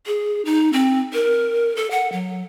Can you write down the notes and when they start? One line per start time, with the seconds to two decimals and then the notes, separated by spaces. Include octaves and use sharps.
0.06 G#4
0.45 D#4
0.73 C4
1.13 A#4
1.76 A4
1.91 F#5
2.12 F#3